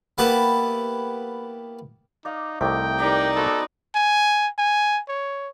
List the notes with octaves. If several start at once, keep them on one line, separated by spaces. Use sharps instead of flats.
A#3 B3 E4 G4 B4 A5
D#4 D5 F5
C2 C3 A3 D#4 G5 D6
D#4 G4 A#4 D5
B3 C4 F#4 A4
G#5
G#5
C#5